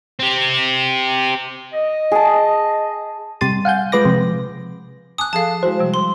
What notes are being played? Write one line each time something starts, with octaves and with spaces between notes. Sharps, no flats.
C4 G4
D#5
G#4 A5
C3 G3 C6 A6 D#7
F5 F#5 G#5 G6
G#3 F4 B4 D6 A#6
C3 F3 G#3
G#5 A5 D6 D#6 F#6
F3 G#4 A4 F5 A5
G#3 E4 F#4 C5
C3 F3 G3
C6